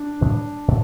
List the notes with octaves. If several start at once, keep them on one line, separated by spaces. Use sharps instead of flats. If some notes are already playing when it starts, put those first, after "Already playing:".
Already playing: D4
A2 E3 G3 B3
A2